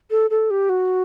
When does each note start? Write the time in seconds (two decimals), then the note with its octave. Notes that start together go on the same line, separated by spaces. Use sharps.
0.11 A4
0.30 A4
0.50 G4
0.69 F#4